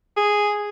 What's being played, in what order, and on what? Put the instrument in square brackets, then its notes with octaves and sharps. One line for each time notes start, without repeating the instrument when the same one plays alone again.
[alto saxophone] G#4